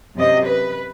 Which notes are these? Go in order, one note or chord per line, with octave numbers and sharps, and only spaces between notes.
F#2 C3 D#5
B4